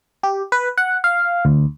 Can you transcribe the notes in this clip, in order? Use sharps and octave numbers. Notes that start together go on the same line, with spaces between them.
G4
B4
F#5
F5
D2